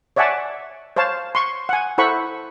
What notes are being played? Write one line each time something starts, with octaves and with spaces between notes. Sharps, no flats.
C#5 D5 E5 F#5 G#5 A5
C5 C#5 F5 A5
C6 C#6
F#5 G#5
E4 A4 C5 F#5 B5 C#6